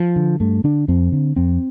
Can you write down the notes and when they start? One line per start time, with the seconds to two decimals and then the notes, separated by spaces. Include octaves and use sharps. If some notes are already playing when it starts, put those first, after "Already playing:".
Already playing: F3
0.16 D3
0.40 G2 A3
0.64 D3 D4
0.88 F2 C4
1.12 D3
1.36 F2 C4